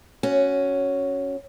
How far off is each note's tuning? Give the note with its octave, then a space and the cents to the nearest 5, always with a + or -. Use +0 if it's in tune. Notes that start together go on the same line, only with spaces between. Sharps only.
C#4 +0 F#4 +0